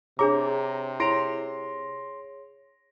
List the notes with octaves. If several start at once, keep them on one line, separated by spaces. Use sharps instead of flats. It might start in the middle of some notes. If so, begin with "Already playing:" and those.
C3 D4 G#4 C#5 A#5 D6
E4 G#4 C#5 C6 A#6 D7 F7